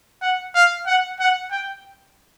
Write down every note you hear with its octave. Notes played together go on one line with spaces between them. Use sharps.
F#5
F5
F#5
F#5
G5